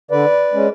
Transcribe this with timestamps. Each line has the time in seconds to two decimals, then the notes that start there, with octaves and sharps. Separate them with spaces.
0.11 D3 B4 D5
0.53 G#3 C#4